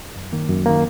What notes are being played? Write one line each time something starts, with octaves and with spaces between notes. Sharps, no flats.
F#2
D#3 A#3
F#2
D#3 A#3